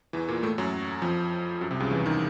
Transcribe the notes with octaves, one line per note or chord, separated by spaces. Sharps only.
E2 E3
A#2 A#3
A2 A3
F#2 F#3
F2 F3
F#2 F#3
C2 C3
C#2 C#3
E2 E3
D#3